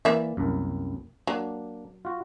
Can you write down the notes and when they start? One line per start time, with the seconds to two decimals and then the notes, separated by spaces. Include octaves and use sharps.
0.05 E3 A#3 D5 E5
0.37 C2 F#2
1.27 F#3 A#3 D4
2.05 F4 F#4